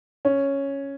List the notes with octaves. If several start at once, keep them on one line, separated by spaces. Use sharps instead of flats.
C#4